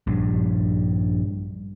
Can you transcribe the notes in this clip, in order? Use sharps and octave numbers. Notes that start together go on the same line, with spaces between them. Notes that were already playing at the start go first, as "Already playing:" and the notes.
A#1 G2